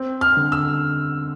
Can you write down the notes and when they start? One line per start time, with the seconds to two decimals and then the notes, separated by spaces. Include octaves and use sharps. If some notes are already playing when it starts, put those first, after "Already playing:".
Already playing: C4
0.21 F6
0.37 D3
0.52 E6